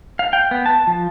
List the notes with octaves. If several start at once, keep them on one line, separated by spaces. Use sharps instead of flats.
F5
G5
B3
A5
F3